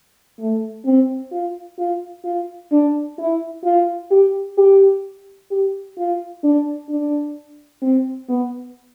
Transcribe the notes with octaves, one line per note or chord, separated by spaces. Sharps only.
A3
C4
F4
F4
F4
D4
E4
F4
G4
G4
G4
F4
D4
D4
C4
B3